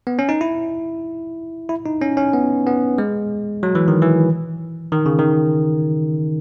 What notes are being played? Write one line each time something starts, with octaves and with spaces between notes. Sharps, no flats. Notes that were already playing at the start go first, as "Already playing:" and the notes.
B3
C#4
D#4
E4
E4
D#4
C#4
C#4
B3
B3
G#3
F#3
E3
D#3
E3
D#3
C#3
D#3